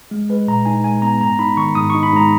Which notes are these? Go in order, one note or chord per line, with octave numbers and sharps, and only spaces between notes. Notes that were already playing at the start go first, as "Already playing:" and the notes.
G#3
G#3 B4
A#2 A#5
D#4 G#5
G#3 G#5
B3 A#5
G#2 A#5
D#4 B5
D#3 C#6
G#2 D#6
C#6
D#4
B5
G#2 A#5